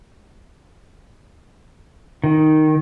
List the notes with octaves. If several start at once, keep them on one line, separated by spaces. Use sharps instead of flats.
D#3